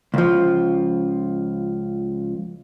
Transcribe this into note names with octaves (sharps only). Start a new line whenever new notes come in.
C#2 F3